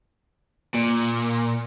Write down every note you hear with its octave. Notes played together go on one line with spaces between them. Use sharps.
A#2